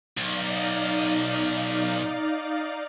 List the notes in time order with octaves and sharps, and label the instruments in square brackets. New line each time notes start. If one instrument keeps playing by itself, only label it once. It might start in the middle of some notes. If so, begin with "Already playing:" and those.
[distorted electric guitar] B1 [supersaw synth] D#4 D5 F5